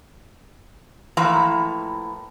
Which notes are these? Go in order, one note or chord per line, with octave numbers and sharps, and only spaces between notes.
A2 E3 F3 A#3 E5 A#5